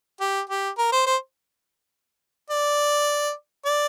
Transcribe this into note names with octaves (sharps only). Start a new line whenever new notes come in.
G4
G4
A#4
C5
C5
D5
D5